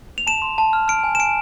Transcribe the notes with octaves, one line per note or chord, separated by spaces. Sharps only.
F7
A5 E7
C6
A5
F6
F6 D7
G#5
E7
G#5 D7